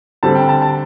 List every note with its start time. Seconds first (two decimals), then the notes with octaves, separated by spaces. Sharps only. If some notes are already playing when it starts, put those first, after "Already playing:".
0.23 D3 G3 C4 A5
0.35 G5
0.49 A5
0.62 A5